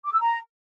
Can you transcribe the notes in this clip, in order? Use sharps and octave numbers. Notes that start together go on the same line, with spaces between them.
D6
E6
A#5